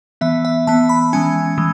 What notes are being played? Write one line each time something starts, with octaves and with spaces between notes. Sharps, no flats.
E3 B3 E5
E5
E3 B3 A5
B5
E3 G#3 C#4 G#5
E3 G#3